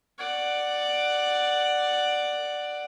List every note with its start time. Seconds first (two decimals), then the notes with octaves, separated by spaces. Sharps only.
0.18 D5 F#5